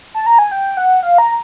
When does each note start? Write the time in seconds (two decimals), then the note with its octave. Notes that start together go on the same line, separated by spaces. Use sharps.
0.14 A5
0.26 A#5
0.39 G#5
0.52 G5
0.77 F#5
1.03 F5
1.18 A#5